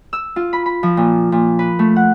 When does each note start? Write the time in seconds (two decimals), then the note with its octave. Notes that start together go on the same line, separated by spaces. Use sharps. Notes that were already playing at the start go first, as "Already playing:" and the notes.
0.13 E6
0.36 F4
0.53 B5
0.66 B5
0.83 F3
0.97 A#2
1.32 A#2
1.59 B4
1.79 A3
1.96 F#5